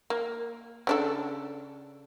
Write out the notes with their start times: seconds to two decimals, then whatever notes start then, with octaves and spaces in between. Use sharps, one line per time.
0.10 A#3
0.87 C#3 D4 A4